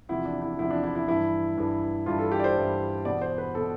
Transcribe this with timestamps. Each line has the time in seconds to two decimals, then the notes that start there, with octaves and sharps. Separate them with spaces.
0.09 E2 C3 F3 E4
0.25 D4
0.42 E4
0.59 E2 C3 F3 E4
0.71 D4
0.84 E4
0.95 E4
1.08 G2 E3 E4
1.57 G2 E3
2.06 G2 E3 F4
2.19 A4
2.32 G4
2.40 D5
2.44 C5
2.56 G2 E3
3.05 E2 B2 D5
3.21 C5
3.38 B4
3.55 B2 A4